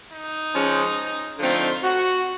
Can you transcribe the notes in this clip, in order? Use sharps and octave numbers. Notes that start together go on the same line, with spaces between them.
D#4
F3 G#3 C#4
D3 F3 A3 C4 D#4 F4
F#4